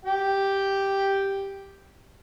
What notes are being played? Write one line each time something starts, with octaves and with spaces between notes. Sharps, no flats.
G4 G5